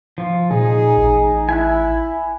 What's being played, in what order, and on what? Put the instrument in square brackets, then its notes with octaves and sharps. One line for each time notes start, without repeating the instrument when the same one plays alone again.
[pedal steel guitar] F3 F4
[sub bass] A#2 [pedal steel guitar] D#4 [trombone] G#4
[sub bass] A1
[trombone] E4 [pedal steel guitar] G#5 B5 F#6